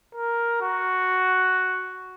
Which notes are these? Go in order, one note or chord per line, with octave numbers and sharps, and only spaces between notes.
A#4
F#4